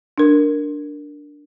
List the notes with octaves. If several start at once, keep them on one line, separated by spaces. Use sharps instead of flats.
D4 A#4